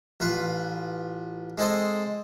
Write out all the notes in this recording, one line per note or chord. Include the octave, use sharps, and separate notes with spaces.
A1 F4 B4
G#3 C4 A4 C5 D#5